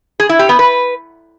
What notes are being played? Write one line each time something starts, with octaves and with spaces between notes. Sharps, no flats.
G#4
E4
G4
B3
B4